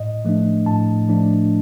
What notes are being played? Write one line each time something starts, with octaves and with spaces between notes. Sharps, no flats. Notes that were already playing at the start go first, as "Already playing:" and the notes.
Already playing: A2 D#5
F3 A3 D4
A2 A5
F3 A3 D4